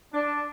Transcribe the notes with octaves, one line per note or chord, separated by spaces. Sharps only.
D4